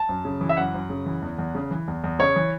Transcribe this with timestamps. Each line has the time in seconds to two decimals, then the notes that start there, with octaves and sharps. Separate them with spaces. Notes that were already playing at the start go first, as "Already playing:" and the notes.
Already playing: A5
0.09 F#2
0.25 C#3
0.41 E3
0.49 E5
0.57 F#2 F#5
0.74 F#2
0.90 C#3
1.06 E3
1.22 E2
1.38 E2
1.55 C#3
1.71 E3
1.88 E2
2.04 E2
2.19 C#3 C#5
2.36 E3